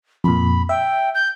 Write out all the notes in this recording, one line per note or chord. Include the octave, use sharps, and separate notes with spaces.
F2 A#2 B5
E5 G5
G6